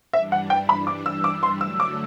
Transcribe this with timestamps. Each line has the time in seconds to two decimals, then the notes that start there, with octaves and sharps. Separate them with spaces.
0.13 G2 E3 G3 D4 E5
0.32 F#5
0.50 G5
0.69 B5
0.87 D6
1.06 E6
1.24 D6
1.43 C6
1.61 D3 F#3 A3 E6
1.80 D6